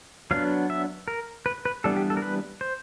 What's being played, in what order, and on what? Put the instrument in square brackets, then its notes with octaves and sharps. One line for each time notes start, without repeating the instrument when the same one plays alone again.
[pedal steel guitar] F#3 B3 D4 F5
E5
A#4
B4
B4
E3 G3 B3 D4 A4
G4
A4
A#4
B4
C5